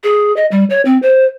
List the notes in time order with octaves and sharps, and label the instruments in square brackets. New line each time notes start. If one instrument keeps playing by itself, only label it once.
[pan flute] G#4
D#5
G3
C#5
C4
C5